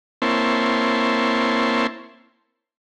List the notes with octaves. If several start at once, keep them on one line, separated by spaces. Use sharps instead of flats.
A#3 C4 E4 C#5 A5 C6